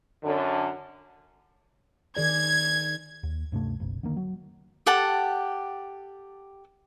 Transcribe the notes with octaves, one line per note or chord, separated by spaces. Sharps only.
F#2 D3
D#3 G#4 D5 G#6
D#2
D2 G2 C3 A3
F#1 B1
D3 D#3 A#3
F#3
G4 A4 F#5 A5